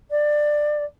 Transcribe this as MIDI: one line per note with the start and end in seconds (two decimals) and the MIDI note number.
0.10 0.84 74